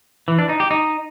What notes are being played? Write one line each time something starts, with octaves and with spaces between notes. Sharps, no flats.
E3
D4
D#4
G4
D#4